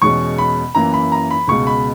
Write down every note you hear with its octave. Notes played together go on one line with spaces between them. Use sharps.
E2 B2 G#3 C#4 C#6
B5
F#2 E3 A#3 E4 A#5
B5
A#5
B5
C#2 B2 G#3 C#6
B5